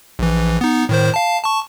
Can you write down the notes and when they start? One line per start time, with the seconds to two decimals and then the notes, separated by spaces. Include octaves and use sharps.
0.19 A#1 E3
0.61 B3 D#4
0.89 A2 D#3 C5
1.14 F5 A5
1.43 A5 C#6